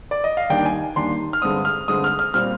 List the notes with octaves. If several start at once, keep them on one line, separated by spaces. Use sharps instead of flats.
D5
D#5
F5
D#2 D#3 G3 A#3 D4 G5
G#5
D#2 D#3 G3 A#3 D4 C6
F6
G2 D3 G#3 C4 D#6
F6
G2 D3 G#3 C4 D#6
F6
F6
A#2 G3 C4 F6